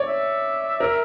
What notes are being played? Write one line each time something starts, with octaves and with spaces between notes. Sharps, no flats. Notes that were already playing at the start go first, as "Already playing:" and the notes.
Already playing: C#5 D5
E5
A#4